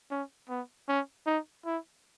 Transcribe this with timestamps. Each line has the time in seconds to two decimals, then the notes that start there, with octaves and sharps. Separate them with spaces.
0.11 C#4
0.49 B3
0.88 C#4
1.27 D#4
1.66 E4